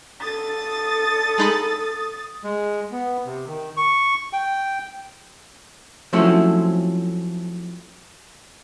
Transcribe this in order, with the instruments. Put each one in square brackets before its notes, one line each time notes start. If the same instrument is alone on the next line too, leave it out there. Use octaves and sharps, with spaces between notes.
[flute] A4 [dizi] D#6 [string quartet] A6
[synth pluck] G#3 D#4 B5
[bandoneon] G#3
B3
C3
D#3
C#6
G5
[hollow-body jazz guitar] F3 F#3 A3 C4 C#4 E4